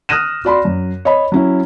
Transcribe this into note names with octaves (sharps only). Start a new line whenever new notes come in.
D#6 F6 F#6 A#6 D#7 E7
F#4 D5 B5 C6
F#2
C#5 D#5 B5
F#3 C#4 E4